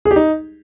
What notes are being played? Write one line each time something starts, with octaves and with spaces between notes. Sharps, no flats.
G#4
G4
D#4